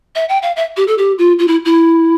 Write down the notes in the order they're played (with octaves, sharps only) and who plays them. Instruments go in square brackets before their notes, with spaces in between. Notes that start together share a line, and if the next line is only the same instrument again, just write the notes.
[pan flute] E5
G5
F5
E5
G4
A4
G4
F4
F4
E4
E4